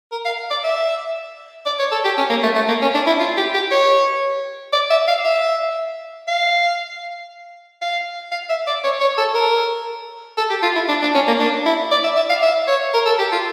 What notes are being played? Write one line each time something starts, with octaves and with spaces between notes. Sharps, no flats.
A#4
F5
D5
E5
D5
C#5
A4
G4
C#4
A#3
A3
A3
A#3
C#4
D4
E4
F4
G4
G4
C#5
D5
E5
F5
E5
F5
F5
F5
E5
D5
C#5
C#5
A4
A#4
A4
G4
F4
E4
D4
D4
C#4
A#3
D4
E4
D5
E5
E5
F5
E5
C#5
A#4
A4
G4
F4